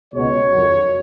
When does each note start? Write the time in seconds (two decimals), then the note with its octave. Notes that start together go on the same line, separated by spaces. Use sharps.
0.14 C#2 B2 G#3 C#5
0.52 F2 D#3 F#3